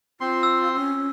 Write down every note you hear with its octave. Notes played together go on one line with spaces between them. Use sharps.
C4 F4 C6
E6
C#4